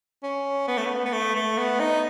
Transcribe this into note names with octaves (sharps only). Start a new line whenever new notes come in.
C#4
B3
A3
B3
B3
A3
A3
B3
D#4